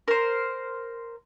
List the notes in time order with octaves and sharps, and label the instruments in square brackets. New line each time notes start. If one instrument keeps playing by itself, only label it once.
[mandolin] A#4 C5